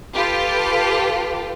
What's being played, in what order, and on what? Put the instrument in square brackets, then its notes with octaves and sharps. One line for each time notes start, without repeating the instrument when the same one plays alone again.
[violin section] F4 G4 A4 B4